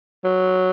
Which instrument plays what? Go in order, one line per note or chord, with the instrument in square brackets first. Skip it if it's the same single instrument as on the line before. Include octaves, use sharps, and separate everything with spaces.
[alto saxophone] F#3